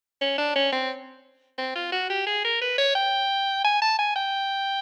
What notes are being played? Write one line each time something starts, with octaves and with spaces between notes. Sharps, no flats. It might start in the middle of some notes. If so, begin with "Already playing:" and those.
C#4
D4
C#4
C4
C4
F4
F#4
G4
G#4
A#4
B4
C#5
G5
G#5
A5
G#5
G5